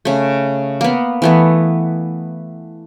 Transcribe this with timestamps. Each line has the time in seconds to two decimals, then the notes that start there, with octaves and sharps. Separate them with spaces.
0.05 C#3 A3
0.81 A#3 B3
1.22 E3 A3 B3